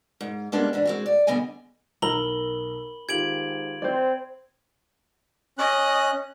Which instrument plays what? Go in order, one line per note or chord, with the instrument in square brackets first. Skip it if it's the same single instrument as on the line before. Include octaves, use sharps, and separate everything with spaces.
[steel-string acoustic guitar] G#2
G3 G#3 A#3 B3 C#4 D4
G#2 E3 D4
G#3 C4 F#4
D5
D3 G3 B3 D#5 G5 G#5
[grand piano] B1 E6 [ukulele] A#4 A#5 [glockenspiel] B5 F#7 G7
[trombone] G#2 [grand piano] D#3 F4 G4 [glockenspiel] G#6 D7 F#7
[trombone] C4 [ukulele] C5 D5
[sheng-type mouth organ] C#4 F#6 [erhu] D#5